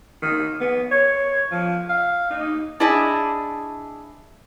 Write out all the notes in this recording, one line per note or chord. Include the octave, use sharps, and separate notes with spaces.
D#3
B3
C#5
F3
F5
D#4
D4 E4 G#4 D#5 A5